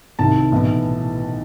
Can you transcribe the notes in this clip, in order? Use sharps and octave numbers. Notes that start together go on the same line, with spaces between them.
C2 C3 D#3 A5
B1 A2 E3